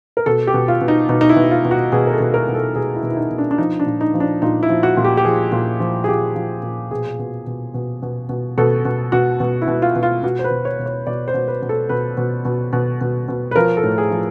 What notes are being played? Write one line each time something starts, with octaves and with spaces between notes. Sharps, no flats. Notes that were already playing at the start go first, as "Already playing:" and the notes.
A#4
B2 A4
G4
B2
F4
B2
D#4
B2 D#4
D#4
E4
B2
F4
B2
F#4
B2 G#4
A#4
A4
B2
A#4
B2
A4
B2 G#4
E4
B2
E4
D#4
B2
D4
D4
F3 D#4
D4
A#2
D#4
F3
D4
A#2 D#4
E4
F3
F#4
A#2
G4
G4
F3 G#4
A#2
F3
G#4
A#2 G4
F3
A#2
B2 G#4
B2
B2
B2
B2
B2
B2 A4
B2
B2 F#4
B2
E4
B2
F4
B2
F4
B2 F#4
C5
B4
B2
C#5
B2
C#5
B2 D5
C5
B2
B4
B2
A4
B2 B4
B2
B2
B2
B2
B2
B4
F3 A#4
A4
A2
G#4
F3